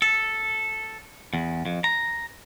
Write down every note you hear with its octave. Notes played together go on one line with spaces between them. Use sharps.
A4
E2
F2
A#5